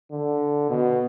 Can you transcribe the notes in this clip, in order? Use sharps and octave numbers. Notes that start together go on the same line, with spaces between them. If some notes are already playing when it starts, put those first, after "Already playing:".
D3
B2